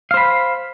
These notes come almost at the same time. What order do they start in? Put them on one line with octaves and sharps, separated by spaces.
F5 C5 B5